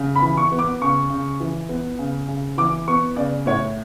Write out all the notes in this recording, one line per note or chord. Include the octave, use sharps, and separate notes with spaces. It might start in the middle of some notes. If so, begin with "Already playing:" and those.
Already playing: C#3
B5
E3
C#6
B3
D6
C#3 C#6
C#3
E3
B3
C#3
C#3
E3 D6
B3 C#6
C#3 D5
A2 C#5